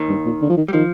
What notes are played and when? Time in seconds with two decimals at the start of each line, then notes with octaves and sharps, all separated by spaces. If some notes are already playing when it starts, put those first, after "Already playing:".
Already playing: D#2 D#3
0.09 G2
0.26 A#2
0.41 D3
0.50 F3
0.57 D#3
0.68 G3
0.73 D#3 F3